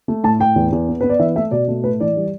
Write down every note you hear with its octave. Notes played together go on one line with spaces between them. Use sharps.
A3
A2 A5
A2 G5
E2
E2
B3
B3 B4
D5
E3 E5
A3 E5
B2 D5
A3
A2 B4
E3 D5
G3